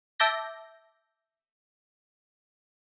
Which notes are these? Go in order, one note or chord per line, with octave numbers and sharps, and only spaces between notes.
E5 A5 D6 G6 A#6